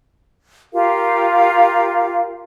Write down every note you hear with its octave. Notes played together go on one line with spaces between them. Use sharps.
F4 G4 A#4 F5